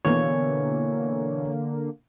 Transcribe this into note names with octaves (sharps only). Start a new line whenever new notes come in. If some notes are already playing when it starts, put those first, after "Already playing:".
B2 D3 E3 A#3 C#5